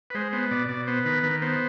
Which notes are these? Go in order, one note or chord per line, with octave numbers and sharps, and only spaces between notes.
B4
G#3 C5
B3 C5
B2 D5
B2 D5
B3 C5
D#3 B4
D#3 B4
B3 C5